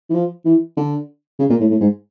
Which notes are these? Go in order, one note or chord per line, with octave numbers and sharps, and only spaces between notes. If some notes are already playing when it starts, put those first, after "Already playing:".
E3
F3
E3
D3
C#3
A#2
A2
A2
G#2